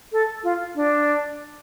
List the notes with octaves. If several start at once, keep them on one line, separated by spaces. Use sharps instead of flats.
A4
F4
D4